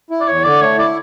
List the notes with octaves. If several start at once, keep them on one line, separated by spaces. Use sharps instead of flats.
E4
D5
E2 C#5
D3 D5
A3 C#5
E4 D5